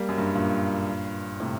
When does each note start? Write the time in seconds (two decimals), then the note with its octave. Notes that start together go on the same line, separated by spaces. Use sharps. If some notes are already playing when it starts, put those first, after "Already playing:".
Already playing: G3 A#3
0.09 F#2
0.18 G2
0.35 G2 A#2
1.40 A2 C3